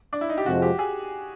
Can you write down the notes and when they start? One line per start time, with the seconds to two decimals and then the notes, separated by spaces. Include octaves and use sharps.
0.13 D4
0.21 E4
0.30 D#4
0.38 G4
0.46 F2 C3 F3 G#3 F#4
0.62 G4
0.79 G#4